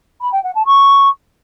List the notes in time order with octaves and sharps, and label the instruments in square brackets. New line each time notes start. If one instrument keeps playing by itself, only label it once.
[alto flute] B5
G5
F#5
A5
C#6